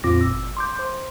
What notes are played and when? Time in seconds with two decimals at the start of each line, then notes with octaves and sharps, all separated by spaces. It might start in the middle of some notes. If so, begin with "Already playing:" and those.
0.04 F2 A#2 C4 F4 D6 A#6
0.21 G1 E6
0.57 C6 D6 G6
0.77 C5 C6